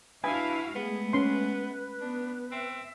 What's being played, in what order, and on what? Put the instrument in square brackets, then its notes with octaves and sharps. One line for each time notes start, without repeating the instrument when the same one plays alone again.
[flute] D4 [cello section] E4 F#4 F5 [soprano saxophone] B4 [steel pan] G#5
[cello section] G#3 A3 [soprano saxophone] B3 [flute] G#4
[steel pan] C#4 C6 [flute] B4
[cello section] B3 [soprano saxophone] D4
[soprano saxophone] C4 [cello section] E5